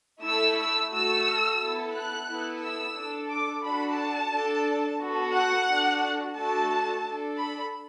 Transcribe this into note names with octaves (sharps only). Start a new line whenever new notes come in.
A3 E4 A4 E6
E6
A3 F#4 A4 E6
B3 E4 A4
F#6
B3 E4 A4
E6
D4 A4
D6
D4 F#4 A4 B5
A5
D4 A4
B3 F#4 A4
F#5
D4 F#4 A4
A3 D4 F#4 A4 A5
D4 A4
B5